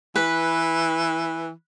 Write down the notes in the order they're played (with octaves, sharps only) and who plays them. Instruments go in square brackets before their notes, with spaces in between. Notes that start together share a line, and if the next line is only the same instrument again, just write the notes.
[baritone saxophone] E3 [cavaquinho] B4